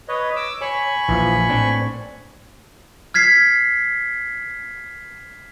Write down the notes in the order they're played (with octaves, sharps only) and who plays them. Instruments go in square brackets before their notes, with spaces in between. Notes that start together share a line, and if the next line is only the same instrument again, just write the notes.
[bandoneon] B4 C#5 D#5
D6 E6
[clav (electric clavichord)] C#5 [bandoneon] G#5 B5 C#6
[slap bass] A#1 [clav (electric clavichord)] E3 F3
[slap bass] A2 [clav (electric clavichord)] C4 D4
[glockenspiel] F6 G#6 B6 C7